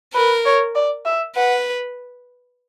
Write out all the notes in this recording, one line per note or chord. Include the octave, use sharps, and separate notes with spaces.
A#4 B4
C#5
D5
E5
B4 F#5